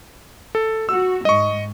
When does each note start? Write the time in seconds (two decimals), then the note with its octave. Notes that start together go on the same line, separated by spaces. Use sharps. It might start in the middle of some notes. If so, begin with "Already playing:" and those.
0.55 A4
0.89 F#4 E6
1.25 G#2 D#5 C#6